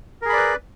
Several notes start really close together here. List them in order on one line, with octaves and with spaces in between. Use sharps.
A#4 G#4 B5 D5 B4